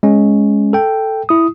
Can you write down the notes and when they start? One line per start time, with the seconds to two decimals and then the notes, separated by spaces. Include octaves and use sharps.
0.03 G#3 C#4
0.73 A4 G5
1.29 E4 D#6